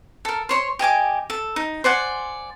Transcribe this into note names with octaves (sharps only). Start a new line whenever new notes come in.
A4 A#4
C5 C#5 C6
G4 D#5 G#5 D6
A4
D#4
C5 D5 F#5 G#5